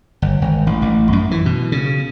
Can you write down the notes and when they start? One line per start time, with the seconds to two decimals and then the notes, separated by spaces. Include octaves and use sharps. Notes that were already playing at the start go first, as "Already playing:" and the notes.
0.22 G1
0.42 G#1
0.67 A1
0.82 A1
1.13 F#2
1.31 E3
1.46 B2
1.72 C#3